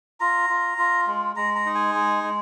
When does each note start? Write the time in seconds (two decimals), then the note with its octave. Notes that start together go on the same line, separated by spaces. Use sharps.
0.20 F4 A#5
0.50 F4
0.78 F4
1.07 G#3
1.36 G#3 A#5
1.55 A#5
1.66 D#4
1.75 G#5
1.95 G#3
2.24 G#3